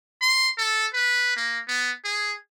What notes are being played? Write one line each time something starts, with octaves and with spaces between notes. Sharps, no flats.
C6
A4
B4
A#3
B3
G#4